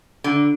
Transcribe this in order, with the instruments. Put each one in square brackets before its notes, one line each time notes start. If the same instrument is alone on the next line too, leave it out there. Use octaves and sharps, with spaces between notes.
[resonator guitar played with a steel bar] D3